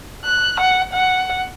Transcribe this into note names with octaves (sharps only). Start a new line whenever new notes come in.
F#6
F#5
F#5